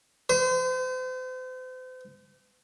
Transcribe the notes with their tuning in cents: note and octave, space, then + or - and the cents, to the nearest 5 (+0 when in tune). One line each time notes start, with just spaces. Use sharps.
C5 -40